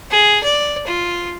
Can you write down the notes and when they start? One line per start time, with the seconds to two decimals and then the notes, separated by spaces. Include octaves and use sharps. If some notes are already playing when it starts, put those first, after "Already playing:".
0.11 G#4
0.44 D5
0.87 F4